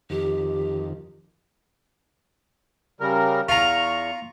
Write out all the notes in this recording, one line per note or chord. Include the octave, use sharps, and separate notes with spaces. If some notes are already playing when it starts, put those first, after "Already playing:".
F2 D#3 G4
C#3 G3 A#4
E2 F4 A#5 C#6